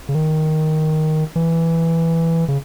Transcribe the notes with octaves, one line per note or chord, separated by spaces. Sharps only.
C#3
D#3
E3
C#3